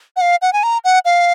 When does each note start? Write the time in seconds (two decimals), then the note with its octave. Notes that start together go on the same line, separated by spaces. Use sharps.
0.16 F#5
0.21 F5
0.42 F#5
0.53 G#5
0.63 A#5
0.84 F#5
1.05 F5